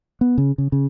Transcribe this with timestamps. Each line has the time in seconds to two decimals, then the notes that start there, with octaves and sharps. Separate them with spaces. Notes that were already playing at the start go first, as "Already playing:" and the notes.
0.21 B3
0.38 C#3
0.58 C#3
0.72 C#3